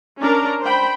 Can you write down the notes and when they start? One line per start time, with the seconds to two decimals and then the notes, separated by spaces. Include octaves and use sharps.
0.20 C#4 D4 A#4 A#5
0.63 C5 G5 B5